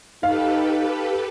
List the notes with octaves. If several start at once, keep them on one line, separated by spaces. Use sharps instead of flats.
D#4 G4 A4 B4 F5